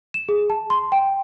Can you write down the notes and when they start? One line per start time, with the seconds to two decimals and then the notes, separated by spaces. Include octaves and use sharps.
0.14 E7
0.29 G#4
0.50 A5
0.70 C6
0.92 G5